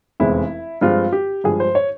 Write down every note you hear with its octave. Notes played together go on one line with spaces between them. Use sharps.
F1 E2 E3 G#3 C4 E4
G2 F3 G#3 C4 F4
G4
G2 F3 G#3 G#4
C5
C#5